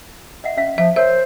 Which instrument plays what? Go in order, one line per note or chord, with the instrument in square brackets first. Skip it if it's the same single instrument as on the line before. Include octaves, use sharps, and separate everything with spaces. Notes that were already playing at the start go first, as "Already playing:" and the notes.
[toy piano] D#5 E5 F#5
C#4 E5 F5
[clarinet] F3 [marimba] E5 [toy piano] F5
[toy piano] A#4 C#5 [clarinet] C5 [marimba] E5